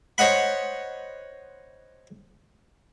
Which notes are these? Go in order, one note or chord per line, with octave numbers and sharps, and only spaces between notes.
C5 C#5 D#5 F#5 B5